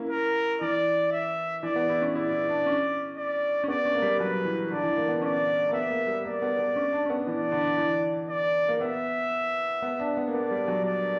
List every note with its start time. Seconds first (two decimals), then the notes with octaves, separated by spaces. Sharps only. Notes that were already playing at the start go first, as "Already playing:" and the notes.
Already playing: A#3 C#4 E4
0.10 A#4
0.61 E3 D5
1.12 E5
1.63 E3 D5
1.76 B3
1.90 E4
2.02 C#4
2.15 E4 D5
2.32 E4
2.49 D4
2.66 C#4
3.17 D5
3.64 C#4
3.68 B3 D5
3.85 C#4
3.95 A#3
4.02 G3
4.20 F#3 B4
4.45 E3
4.71 D3 D5
4.84 E3
4.96 A#3
5.09 B3
5.22 C#4 D5
5.68 A#3
5.73 B3 E5
5.90 A#3
6.07 G3
6.24 A#3 D5
6.42 B3
6.59 B3
6.76 C#4
6.93 D4
7.05 C#4
7.10 B3
7.27 E3 D5
7.52 D3
7.78 E3
8.29 D5
8.69 A#3
8.80 B3 E5
9.82 B3
10.00 D4
10.17 B3
10.28 A#3
10.34 B3 D5
10.51 G3
10.68 F#3
10.85 D5